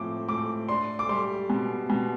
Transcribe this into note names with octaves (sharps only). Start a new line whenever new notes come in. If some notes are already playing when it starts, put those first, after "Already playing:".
Already playing: A2 F3 C4 D6
A2 D6
D4 C6
D6
G3 C6
B2
B2